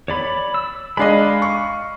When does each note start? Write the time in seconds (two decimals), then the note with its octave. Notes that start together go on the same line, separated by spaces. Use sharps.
0.08 C#5 D5 B5
0.54 E6
0.97 G#3 D4 D#5 F5 B5
1.42 C#6